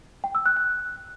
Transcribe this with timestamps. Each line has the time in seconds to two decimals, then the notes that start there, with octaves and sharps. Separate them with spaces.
0.24 G5
0.35 E6
0.46 F#6
0.57 F#6